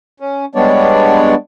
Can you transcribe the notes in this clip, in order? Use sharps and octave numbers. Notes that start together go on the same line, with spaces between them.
C#4
G3 G#3 B3 D4 C#5 D5